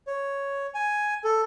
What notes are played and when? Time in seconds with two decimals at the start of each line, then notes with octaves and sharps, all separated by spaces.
0.07 C#5
0.74 G#5
1.24 A4